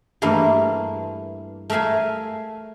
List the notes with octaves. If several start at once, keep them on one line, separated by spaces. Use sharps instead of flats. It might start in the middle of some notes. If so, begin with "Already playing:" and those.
G2 E3 A3 A#3
A3 A#4 E5 F5 G#5